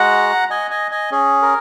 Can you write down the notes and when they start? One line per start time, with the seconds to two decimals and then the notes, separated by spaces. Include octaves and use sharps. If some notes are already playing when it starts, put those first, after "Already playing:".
Already playing: G#3 F#4 F#5 A#5
0.51 D#5 G#5
0.71 D#5 G#5
0.91 D#5 G#5
1.11 C#4 G#4
1.42 A#4